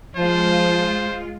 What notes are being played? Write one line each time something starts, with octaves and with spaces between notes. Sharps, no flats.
F3 G#3 F4 C5